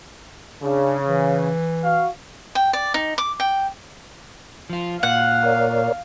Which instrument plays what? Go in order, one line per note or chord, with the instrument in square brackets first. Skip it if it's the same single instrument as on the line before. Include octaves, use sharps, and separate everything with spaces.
[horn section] C#3 [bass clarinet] D4
[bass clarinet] E3
[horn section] F#4 F5
[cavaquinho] G5
D5
D#4
D6
G5
[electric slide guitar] F3 F4
[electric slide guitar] A#2 [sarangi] F5 [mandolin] F#5
[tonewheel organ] A#4 C#5 D5